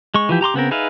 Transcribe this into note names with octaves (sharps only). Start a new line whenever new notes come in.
G#3 C#6
E3 F3 G4
G4 A#5 C6 D6
C#3 B3 C4 A#4
D#4 G#4 B4 E5 F5